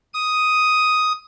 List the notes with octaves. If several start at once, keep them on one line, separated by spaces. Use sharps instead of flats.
D#6